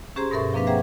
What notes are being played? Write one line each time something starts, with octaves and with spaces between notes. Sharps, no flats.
C#4 G4 G#4 C5 A#5 C6
G2 B2 A4 A#4 E5 C#6
F3 A#3 C4 D4 B4 F5
G#4 C5 E5 F#5 G5 A#5